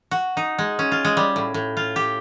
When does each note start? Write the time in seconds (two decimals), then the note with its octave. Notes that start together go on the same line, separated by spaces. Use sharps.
0.11 F#4
0.37 D#4
0.59 G#3
0.79 C#4
0.92 F4
1.05 G#3
1.17 G3
1.36 A2
1.54 A2
1.77 F4
1.96 G4